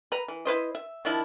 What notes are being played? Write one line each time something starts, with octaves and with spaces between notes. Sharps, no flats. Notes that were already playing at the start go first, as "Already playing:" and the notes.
B4 A#5
E3
E4 B4 C5 D#5
E5
D#3 F3 D4 E4